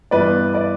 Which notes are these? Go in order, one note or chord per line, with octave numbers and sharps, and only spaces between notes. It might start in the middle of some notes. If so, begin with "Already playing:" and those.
G2 E3 B3 B4 D5
B4 D5